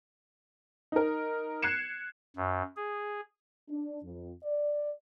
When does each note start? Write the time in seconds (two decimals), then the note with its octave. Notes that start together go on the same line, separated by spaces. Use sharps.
0.92 D#4 A#4
1.62 F#6 G#6 C7 C#7 E7
2.36 F#2
2.77 G#4
3.69 D4
4.03 F2
4.44 D5